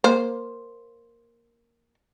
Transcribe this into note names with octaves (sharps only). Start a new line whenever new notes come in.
A#3 C5